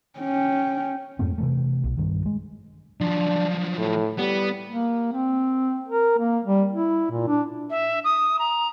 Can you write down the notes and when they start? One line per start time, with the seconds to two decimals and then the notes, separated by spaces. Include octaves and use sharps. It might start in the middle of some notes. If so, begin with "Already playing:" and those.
0.19 C#4 G5
1.19 F2 G#2 A3 C4
1.38 C3 E3 A3
1.84 B1
1.97 G2 D#3
2.26 G#3
3.01 F3 F#3 D4
3.78 A2
4.18 G3 B3
4.70 A#3
5.13 C4
5.88 A#4
6.18 A#3
6.45 G3
6.72 E4
7.11 A#2
7.28 D4
7.70 E5
8.04 D#6
8.39 A#5